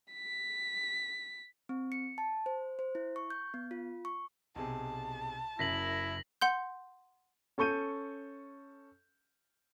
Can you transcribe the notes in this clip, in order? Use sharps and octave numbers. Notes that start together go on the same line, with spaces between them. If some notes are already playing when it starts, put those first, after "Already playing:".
B6
C4
C#7
A5
C5
C5
E4
C#6
G6
B3
F4
C#6
B1 C3 G#4 A5
F#1 F#2 E4 A#6 B6 F#7
F#5 C6 G6
C#4 A4 C#6 G6 D#7